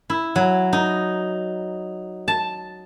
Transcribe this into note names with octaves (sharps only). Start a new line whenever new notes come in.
E4
F#3
D#4
A5